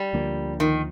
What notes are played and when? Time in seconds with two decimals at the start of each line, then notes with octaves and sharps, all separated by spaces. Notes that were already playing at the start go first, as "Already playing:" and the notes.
Already playing: G3
0.13 D2 D3 F3 A#3
0.60 D#3